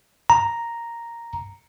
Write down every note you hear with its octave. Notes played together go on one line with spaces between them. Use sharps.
A#5